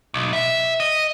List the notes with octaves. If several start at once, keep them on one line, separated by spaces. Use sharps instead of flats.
B1
E5
D#5